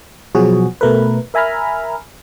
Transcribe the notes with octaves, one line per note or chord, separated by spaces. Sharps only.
B2 F3 F#3 F#4 G#4
B2 A3 A#4 B4
A#4 E5 G#5 A#5 B5 F6